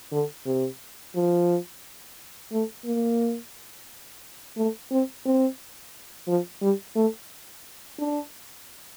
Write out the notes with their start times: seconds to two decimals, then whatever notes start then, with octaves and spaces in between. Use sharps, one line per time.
0.12 D3
0.46 C3
1.15 F3
2.52 A3
2.85 A#3
4.57 A3
4.91 C4
5.26 C4
6.28 F3
6.62 G3
6.96 A3
7.99 D4